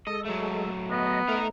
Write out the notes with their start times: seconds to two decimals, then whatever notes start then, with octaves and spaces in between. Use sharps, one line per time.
0.07 G#3 A4 D#5
0.25 F#3 A3
0.90 B3 D#5
1.28 A3 D#4 A#4